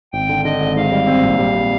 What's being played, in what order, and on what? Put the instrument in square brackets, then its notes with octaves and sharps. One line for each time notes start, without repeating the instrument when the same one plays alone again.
[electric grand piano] G#1 [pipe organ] G5
[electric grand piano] D3
[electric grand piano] D3 [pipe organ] D#5
[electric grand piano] G#1
[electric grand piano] G#2 [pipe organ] F5
[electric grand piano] G3
C4
A#1
G3
G3